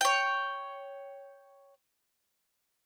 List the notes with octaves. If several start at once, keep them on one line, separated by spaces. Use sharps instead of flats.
C#5 G5